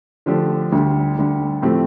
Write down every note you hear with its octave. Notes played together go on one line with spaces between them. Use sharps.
D3 F3 A3 D4 G4
D2 D3 G3
D2 D3 G3
A2 F3 A3 C4 G4